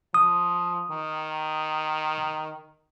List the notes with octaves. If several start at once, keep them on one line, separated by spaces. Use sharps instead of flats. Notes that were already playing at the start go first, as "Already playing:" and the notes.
F3 D#6
D#3